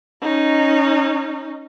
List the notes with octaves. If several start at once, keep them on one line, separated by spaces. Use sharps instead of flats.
C#4 D#4